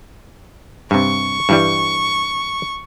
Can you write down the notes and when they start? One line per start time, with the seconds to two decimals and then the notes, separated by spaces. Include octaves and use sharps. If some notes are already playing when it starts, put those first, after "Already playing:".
0.91 G2 C3 C#6
1.49 G2 E3 G3